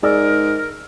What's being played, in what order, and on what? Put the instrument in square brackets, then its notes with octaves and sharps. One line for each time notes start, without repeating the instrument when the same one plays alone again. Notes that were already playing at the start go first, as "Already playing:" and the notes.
[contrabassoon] G#2 [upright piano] G#4 D5 E6 [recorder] A#4